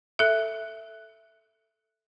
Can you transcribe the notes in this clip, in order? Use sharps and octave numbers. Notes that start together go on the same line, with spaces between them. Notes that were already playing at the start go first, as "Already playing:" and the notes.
A4 E5